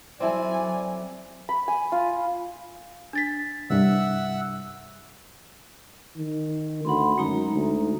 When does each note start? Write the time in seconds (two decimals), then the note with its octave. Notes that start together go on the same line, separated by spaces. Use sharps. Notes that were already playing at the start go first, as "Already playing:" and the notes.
0.20 F#3 C4 E4 A4 D5 G#5
1.49 B5
1.68 G#5
1.92 F4
3.13 D4 A6 B6
3.70 C2 G2 E5 F#5 E6
6.16 D#3
6.85 D2 F#5 B5 C6
7.18 F#2 G#3 D#4 A#5
7.52 D2